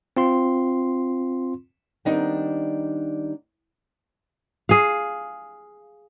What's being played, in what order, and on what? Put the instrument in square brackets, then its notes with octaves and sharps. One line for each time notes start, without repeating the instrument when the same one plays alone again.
[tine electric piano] C4 F4 C6
[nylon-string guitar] D#3 G3 B3 C4 D4 D#4
[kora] G#4 F5